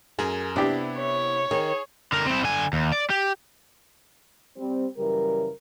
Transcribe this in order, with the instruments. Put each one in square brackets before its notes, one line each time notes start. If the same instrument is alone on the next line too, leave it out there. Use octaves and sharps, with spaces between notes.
[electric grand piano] F#2 A#4 [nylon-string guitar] G#4
[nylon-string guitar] C3 [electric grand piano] B3 E4 [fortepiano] D4 G4
[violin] C#5
[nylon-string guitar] D#3 [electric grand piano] G#4
[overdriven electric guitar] D3 A#4
C4 E4
D3 G#5
D#2
D5
G4
[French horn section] G3 C4
F#2 C#3 E3 G3 A#4